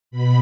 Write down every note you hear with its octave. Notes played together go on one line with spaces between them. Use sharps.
B2 B5